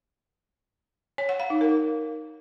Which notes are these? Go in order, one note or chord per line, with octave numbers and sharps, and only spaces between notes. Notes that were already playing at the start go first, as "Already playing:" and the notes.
C#5
F#5
F5
D#4
A#4